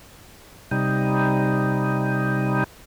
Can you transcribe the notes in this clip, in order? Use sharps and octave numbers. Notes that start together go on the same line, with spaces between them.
C3 G3 D#4